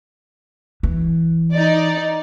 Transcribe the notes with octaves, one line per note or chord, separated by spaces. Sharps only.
E3
D#4 D5